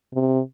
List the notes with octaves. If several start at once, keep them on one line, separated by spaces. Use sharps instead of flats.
C3